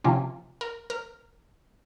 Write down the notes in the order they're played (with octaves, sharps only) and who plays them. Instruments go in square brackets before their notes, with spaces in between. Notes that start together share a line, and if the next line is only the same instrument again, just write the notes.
[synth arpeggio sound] C3 F3 A#3 C#4 F4
A#4
A#4